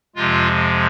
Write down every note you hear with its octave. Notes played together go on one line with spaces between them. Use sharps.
F2 C3 F3 G#3 F4